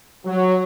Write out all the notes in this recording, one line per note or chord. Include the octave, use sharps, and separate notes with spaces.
F#3